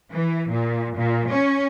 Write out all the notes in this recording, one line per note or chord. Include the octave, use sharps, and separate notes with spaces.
E3
A#2
A#2
C#4